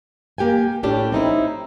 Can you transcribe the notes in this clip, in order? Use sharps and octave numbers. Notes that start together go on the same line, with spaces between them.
A#3 G4 G5 G#5
A2 C#4 D4 G4
C4 D#4 E4